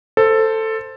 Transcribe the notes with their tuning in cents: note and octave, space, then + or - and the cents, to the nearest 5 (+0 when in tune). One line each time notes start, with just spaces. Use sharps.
A4 +10 C5 +0